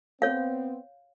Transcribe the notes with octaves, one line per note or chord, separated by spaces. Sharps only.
B3 C4 C#5 F5